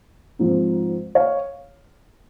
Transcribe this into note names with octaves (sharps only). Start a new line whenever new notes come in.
G#2 F3 C4
C#5 F5